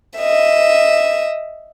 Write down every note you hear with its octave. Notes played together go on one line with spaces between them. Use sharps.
D#5 E5